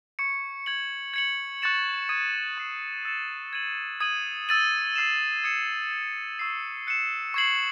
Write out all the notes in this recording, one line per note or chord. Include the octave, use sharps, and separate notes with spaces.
C#6 G#6 C#7
G#6 C#7 F#7
G#6 C#7 F#7
C#6 F#6 A6 C#7 E7
D#6 G#6 D#7
C#6 E6 G#6 C7 F#7
E6 A6 C#7 E7
G#6 D#7 F#7
D#6 G#6 D#7 F#7
E6 A6 D#7 F#7
E6 C7 E7
D#6 G#6 C#7 E7
G#6 C7 E7
C#6 E6 A6 C7
F#6 C#7 E7
C#6 G#6 C7 F#7